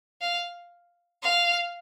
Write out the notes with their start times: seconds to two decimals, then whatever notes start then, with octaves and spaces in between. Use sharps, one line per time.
0.21 F5
1.23 F5